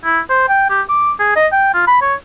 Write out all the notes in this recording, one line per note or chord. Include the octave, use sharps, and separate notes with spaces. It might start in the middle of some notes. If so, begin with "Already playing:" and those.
E4
C5
G5
G4
D6
G#4
D#5
G5
F4
B5
C#5